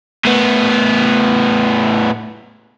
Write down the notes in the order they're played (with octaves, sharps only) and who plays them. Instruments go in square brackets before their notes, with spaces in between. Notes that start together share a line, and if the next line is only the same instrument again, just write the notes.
[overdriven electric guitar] A2 B3